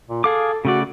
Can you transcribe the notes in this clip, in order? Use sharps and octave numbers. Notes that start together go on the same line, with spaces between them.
A#2
G#4 A4 F5 D6
C#3 A3 F#4 D5